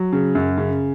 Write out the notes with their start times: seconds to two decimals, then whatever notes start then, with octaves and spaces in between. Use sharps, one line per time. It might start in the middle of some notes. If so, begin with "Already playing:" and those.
Already playing: F#3
0.13 C#3
0.35 F#2
0.57 C#3